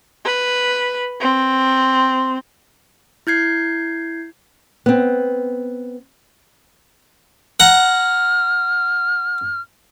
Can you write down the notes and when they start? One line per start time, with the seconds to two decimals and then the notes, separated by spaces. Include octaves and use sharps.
0.25 B4
1.20 C4
3.27 E4 G6 G#6 C7
4.86 B3 C4
7.60 F#5 A#5 F6